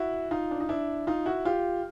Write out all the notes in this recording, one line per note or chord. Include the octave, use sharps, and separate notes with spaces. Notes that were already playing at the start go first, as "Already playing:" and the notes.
Already playing: E4 F#4
D#4 F4
D4
D#4
D4 E4
D#4 F4
E4 F#4
F4 G4